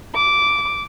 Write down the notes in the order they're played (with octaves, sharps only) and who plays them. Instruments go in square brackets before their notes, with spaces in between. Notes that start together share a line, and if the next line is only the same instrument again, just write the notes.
[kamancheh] D6